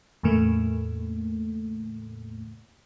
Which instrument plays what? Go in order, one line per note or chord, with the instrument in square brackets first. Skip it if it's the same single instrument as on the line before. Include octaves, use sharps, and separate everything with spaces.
[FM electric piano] E2 A2 C#3 A3 A#3